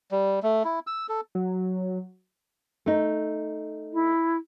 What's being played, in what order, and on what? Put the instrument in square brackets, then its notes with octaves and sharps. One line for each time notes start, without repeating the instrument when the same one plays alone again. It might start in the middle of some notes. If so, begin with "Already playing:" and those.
[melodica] G3
A3
E4
E6
A4
[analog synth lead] F#3
[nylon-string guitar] A3 D#4
[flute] E4